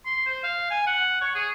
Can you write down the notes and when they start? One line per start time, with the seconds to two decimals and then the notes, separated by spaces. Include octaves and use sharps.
0.06 C6
0.26 C5
0.43 F5
0.71 G#5
0.87 F#5
1.21 C#5
1.35 G#4